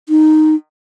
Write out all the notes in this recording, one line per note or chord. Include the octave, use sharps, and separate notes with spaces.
D#4